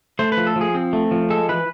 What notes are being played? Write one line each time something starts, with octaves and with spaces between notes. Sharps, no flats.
A3 C5
B4
F3
A4
F3 G#4
C4
A3
F3
G#3 A4
E3 B4